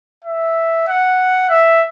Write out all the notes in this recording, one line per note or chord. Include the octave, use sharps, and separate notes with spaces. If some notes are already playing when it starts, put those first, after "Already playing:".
E5
F#5
E5